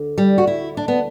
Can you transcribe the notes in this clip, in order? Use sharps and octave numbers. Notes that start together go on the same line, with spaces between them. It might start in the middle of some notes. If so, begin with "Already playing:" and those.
Already playing: D2 D3
G3
F#4
E4
D4
B3